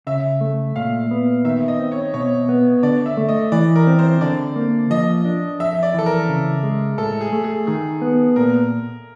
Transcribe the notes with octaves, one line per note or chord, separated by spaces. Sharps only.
C#3 E5
A3
A#2 F5
B3
D#3 E5
D#5
C4
C#5
B2 C#5
B3
D3 D5
E5
A3
D#5
E3 D5
A#4
C4
C5
D3 D5
A#3
F3 D#5
D4
F2 E5
D5
E3 A4
A#4
C#3
G#3
A2 A4
G#4
A3
G#4
D#3 G#4
B3
A#2 A#4